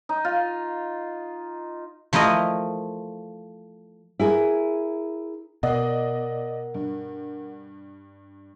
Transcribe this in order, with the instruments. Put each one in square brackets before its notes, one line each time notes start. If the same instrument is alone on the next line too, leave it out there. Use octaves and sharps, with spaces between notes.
[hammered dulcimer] D#4
F4
[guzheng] F3 A3 E4 A#4 D#5
[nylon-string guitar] E4 G#4 A#4
[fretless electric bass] B2 [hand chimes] A#4 F#5 [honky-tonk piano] D5 D#5
[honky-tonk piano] G2